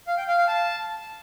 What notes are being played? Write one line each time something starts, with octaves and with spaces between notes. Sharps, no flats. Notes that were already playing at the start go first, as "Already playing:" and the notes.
F5
G5
F5
F5
A5